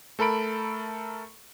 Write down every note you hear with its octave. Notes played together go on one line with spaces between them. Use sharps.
A3 A4 A#4 B5 D7